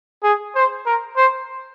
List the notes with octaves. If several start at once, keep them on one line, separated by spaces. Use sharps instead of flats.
G#4
C5
A#4
C5